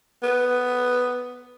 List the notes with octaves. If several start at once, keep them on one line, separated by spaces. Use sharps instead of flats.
B3